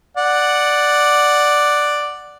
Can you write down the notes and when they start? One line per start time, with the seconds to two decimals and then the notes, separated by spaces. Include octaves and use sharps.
0.17 D5 F#5